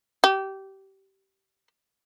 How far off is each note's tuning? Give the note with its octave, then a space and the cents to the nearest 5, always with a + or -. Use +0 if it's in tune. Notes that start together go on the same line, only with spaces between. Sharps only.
G4 -20